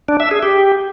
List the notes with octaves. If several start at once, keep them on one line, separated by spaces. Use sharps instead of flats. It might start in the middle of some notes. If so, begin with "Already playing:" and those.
D4
E5
G#4
G4